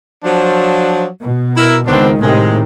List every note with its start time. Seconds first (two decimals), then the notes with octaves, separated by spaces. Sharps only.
0.24 F3 F#3 D4
1.21 B2
1.56 E4 A#4
1.87 C#2 D#3 B3 C4 D4
2.21 A2 C3 D#3 G#3